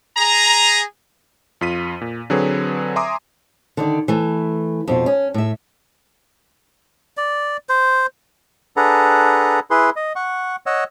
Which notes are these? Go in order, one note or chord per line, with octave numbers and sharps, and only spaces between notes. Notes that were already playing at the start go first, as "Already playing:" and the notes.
G#4 A#5
F2 F4 B6 D#7
A#2
D3 F#3 C4 G#4 B4 C#5
E5 G#5 A#5 C6 D6 D#6
D3 D#3 D5
E3 A3
F2 B2 F4
C#4
A2 E5
D5
C5
D4 G#4 A4 B4 F#5 A#5
E4 G#4 B4 C6
D#5
F#5 C#6
C#5 D#5 F#5 E6